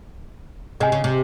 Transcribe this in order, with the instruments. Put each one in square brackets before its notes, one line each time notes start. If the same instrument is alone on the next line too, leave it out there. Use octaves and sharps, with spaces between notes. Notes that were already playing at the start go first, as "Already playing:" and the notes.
[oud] C3 [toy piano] G#4 D#5 G#5
[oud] C#3
C3